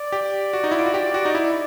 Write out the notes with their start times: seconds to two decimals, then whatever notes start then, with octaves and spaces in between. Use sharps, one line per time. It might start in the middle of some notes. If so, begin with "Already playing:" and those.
Already playing: D5
0.12 G4
0.53 F#4
0.64 D#4
0.71 E4
0.79 F4
0.86 F#4
0.94 G4
1.14 F#4
1.25 D#4
1.35 E4